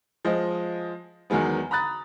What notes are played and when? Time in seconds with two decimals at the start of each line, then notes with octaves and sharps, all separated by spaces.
0.25 F3 G#3 C5 D#5
1.30 E2 D#3 F#3 G#3 B3
1.71 A#5 B5 D#6 F#6 A6